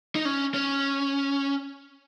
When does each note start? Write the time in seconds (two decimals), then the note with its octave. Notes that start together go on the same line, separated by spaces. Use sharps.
0.15 D#4
0.25 C#4
0.54 C#4